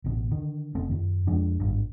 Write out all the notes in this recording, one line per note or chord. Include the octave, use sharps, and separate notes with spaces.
A1 B2
D3 D#3
F1 A3 C4
F#2 D#3
F2 F3 G#3 D4
G#1 G2